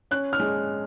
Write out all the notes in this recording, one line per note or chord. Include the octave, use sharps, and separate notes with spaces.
C#4 F#6
F6
G#3